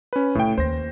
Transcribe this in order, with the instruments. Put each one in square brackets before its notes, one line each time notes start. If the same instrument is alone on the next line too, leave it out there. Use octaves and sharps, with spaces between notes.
[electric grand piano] C#4 B4
[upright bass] C2 [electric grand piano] A2 A3 G5
[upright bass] D#2 [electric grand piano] C5 A#6